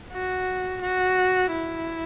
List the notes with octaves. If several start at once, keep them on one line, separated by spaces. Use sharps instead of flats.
F#4
F#4
E4